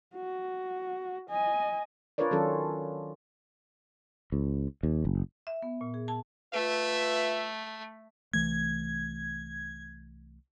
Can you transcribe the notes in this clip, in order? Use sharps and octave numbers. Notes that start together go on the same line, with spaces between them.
F#4
D#5 G#5
D4 F4 A#4 B4 C#5 D5
D#3 F#3 C#4 F4 A4
C#2
D#2
F#1
E5
B3
A#2
G#4
A5
A3 F4 B4 E5
C2 E3 A3 G#6